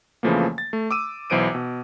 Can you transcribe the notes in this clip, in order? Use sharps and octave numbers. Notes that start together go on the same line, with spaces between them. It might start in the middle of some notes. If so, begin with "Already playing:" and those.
F2 C#3 E3 F3 A3 A#3
A6
A3
D6 E6 D#7
B1 E3 C5 D7 D#7
B2